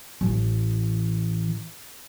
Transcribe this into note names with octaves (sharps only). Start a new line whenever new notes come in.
A1 E3